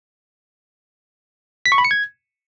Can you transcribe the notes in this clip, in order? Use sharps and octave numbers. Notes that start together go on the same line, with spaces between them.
B6
C#6
B5
C#7
G#6